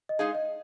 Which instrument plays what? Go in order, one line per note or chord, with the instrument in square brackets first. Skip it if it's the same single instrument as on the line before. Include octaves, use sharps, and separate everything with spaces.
[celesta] D#5
[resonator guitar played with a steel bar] G#3 D#4 G#4 [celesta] F5
[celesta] D#5